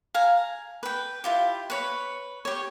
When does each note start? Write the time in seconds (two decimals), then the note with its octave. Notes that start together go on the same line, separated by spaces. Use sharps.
0.14 F5 G#5 A#5
0.83 B4 G5
1.24 E4 F4 G4
1.70 B4 C#5 B5
2.45 G4 C#5